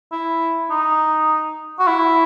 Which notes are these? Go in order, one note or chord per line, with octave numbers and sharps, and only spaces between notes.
E4
D#4
F#4
E4